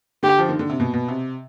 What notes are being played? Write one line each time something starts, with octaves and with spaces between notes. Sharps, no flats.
D3 G4
F3
D#3
D3
C3
B2
B2
C3